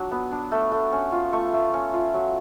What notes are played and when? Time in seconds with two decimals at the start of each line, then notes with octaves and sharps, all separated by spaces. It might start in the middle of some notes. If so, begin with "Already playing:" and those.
Already playing: F#3 D4
0.11 B3
0.32 D4
0.52 A3
0.72 A3
0.92 C#4
1.12 F4
1.33 A3 C#6
1.53 A3
1.74 C#4
1.94 F4
2.14 F#3